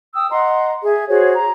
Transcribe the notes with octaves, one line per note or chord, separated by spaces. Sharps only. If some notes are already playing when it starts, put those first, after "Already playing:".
G5 D#6 E6
D#5 F#5 A#5 C6
G#4 E5
F#4 G#4 C5 C#5
A#5